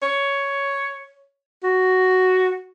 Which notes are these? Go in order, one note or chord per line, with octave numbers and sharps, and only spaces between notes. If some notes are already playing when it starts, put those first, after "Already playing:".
C#5
F#4